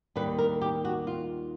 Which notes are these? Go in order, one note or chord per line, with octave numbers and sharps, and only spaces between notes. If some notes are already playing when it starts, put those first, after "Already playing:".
D#2 D#3 G3 B4
A#4
G4
F#4
F4